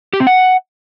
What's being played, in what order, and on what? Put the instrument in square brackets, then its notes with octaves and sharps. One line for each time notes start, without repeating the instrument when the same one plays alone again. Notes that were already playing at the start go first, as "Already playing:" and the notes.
[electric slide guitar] G4
C4
F#5